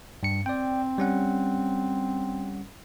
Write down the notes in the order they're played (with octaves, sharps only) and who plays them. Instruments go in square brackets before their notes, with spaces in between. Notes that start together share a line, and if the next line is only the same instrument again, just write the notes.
[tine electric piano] G2 C#7
[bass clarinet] C4 [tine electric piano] D5 G5
[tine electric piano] G3 C#4 F#5